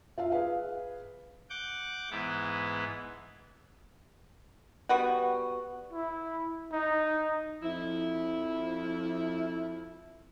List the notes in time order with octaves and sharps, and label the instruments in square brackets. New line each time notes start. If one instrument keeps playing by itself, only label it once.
[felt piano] F4 E5 F5
G#4 B4 F5
[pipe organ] F#5 D6 G6
G#2 E3 B3 E4
[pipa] G3 B3 F#4
[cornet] E4
D#4
[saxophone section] F2 F3 E4